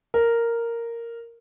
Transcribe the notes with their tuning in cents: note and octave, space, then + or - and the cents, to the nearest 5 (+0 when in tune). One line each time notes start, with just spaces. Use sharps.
A#4 -5